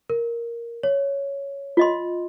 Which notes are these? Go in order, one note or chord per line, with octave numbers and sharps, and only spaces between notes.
A#4
C#5
F4 D#5 C6